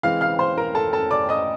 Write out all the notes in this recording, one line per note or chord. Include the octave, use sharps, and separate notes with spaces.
E3 G#3 C4 F5 F6
F5 F6
C5 C6
A#4 A#5
A4 A5
A4 A5
D5 D6
D#5 D#6